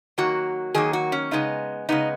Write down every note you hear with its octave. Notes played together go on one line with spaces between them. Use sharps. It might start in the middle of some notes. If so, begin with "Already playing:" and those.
D#3 F#3 A#3 F#4
D#3 F#3 A#3 G#4
F#4
C#4
C#3 G#3 B3 D#4
C#3 G#3 B3 D#4